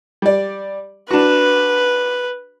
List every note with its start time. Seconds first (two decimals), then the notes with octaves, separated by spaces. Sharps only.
0.22 G3 D5
1.11 D4 F#4 B4